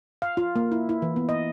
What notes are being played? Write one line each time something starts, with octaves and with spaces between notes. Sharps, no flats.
F5
F4
A#3
E4
E4
E3
B3
D#5